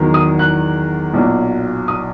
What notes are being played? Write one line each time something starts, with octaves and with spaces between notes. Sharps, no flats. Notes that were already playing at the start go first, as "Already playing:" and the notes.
Already playing: E2 D#3 F#3
D#6
F#6
B1 A#2 F#3
D#6